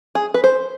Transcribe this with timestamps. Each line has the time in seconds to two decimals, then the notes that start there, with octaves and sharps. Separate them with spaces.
0.15 G#4
0.34 B4
0.44 C5